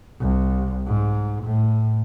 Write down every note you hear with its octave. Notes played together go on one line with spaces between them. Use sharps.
C2
G#2
A2